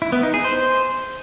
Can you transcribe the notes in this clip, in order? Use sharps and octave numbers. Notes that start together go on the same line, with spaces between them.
E4
B3
D#4
G#4
C5